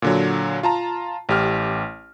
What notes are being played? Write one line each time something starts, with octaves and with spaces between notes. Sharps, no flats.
A#2 D3 F#3
F4 A5 A#5
A1 G4 F6